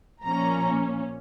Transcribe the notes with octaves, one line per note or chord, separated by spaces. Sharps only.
A#2 F3 A#3 C#4 A#5